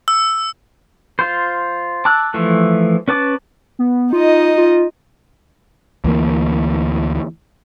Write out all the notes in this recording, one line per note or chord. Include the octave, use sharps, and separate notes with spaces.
E6
F4 C5
A5 D6 E6 F#6
E3 F3 A3
C#4 B4 A5 D6
B3
D#4 F4 D#5
F4
D2 E3 A#3